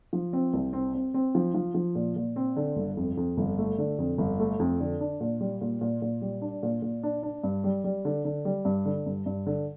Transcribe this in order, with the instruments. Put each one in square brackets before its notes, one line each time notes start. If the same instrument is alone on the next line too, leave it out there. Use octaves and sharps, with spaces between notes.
[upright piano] F3
C4
C2
C4
C4
C4
F3
F3
F3
A#2
A#2
C4
D3
G1
F2
F2
G1
A3
D3
F2
G1
A3
F2
D3
D4
A#2
G3
A#2
A#2
A#2
G3
D4
A#2
A#2
D4
D4
G2
G3
G3
D3
D3
G3
G2
D3
G2
G2
D3